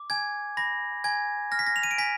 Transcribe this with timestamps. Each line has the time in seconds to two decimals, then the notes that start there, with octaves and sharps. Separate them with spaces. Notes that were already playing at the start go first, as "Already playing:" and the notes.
Already playing: D6
0.10 G#5 G#6
0.57 B5 A#6
1.04 G#5 G#6
1.52 F6 A#6
1.59 B6
1.67 A#6
1.76 F7
1.83 D#7
1.91 D7
1.98 G#5 B6